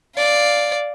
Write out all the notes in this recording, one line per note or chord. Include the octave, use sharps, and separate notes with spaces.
D5 F5